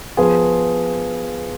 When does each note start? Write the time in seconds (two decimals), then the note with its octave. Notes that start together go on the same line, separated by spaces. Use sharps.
0.17 F3 B3 F4 G#4 B4